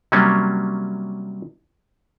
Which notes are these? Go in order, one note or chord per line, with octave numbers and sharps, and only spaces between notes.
C3 F#3 G3 A#3 C#4